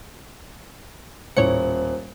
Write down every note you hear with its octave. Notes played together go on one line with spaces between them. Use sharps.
D#1 A2 C5 C#5 C#7